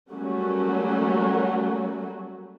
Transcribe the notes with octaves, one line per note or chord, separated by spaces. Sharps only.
F#3 G3 A3 A#3 C#4 F#4